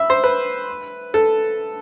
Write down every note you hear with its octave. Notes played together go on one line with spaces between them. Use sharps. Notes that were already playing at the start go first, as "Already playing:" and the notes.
Already playing: E5 B5
C5
B4
A4